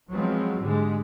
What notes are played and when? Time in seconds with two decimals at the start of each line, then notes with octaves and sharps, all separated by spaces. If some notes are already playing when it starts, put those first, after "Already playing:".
0.12 F3 F#3 G#3 B3 C4
0.61 G#2 D3 G3 G#3